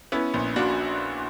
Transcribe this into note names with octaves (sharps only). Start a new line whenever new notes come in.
B3 C#4 E4
A#1
A#2 D4 F#4